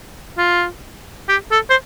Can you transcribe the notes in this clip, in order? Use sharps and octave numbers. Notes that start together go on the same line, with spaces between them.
F4
G4
A4
C5